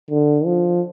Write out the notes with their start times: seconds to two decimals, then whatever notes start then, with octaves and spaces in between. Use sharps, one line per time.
0.10 D3
0.45 F3